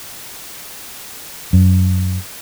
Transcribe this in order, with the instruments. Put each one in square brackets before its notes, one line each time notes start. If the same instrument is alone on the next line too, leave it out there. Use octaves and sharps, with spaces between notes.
[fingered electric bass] F#2